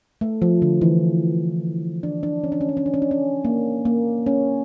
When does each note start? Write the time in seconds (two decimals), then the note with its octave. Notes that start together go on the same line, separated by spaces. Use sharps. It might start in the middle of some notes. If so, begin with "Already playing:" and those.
0.21 A3
0.42 F3
0.62 D3
0.81 E3
2.03 D4
2.23 D4
2.44 C#4
2.52 D4
2.61 C#4
2.69 D4
2.77 C#4
2.86 D4
2.94 C#4
3.02 D4
3.11 C#4
3.45 A#3
3.85 A#3
4.26 C#4